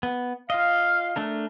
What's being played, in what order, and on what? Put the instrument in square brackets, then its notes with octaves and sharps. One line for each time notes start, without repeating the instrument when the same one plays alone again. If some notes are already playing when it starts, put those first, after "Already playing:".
[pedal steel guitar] B3
[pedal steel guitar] F4 D#5 [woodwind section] F5
[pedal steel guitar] A3 D4 A#4